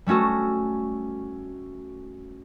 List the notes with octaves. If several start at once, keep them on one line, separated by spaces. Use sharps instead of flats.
G3 A3 C#4 F#4 A4